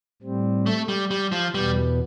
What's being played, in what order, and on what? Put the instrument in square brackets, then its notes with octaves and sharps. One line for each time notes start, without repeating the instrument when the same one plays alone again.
[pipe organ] A2 G3 C4
[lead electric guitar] A3
G3
G3
F3
[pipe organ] E2 B2 B3 [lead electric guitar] G3